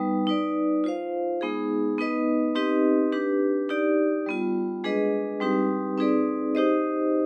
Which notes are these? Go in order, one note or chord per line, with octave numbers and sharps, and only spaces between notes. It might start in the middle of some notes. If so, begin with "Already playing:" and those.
Already playing: G3 B3 D#4 B4
D#4 B4 D5
F4 C5 F5
G#3 B3 D#4 G#4
B3 D#4 B4 D#5
C4 D#4 G4 B4 D#5
D4 G4 B4
D#4 G4 D5
G3 B3 F4
G#3 D4 G#4 B4 D#5
G3 C4 D#4 G4 B4
C4 D#4 G#4 B4 D5
D#4 G4 C5 D#5